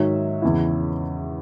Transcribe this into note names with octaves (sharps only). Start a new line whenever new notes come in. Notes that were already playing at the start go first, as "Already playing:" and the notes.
Already playing: G#2 D#3 F#3 C#5 E5
E2 C#3 E3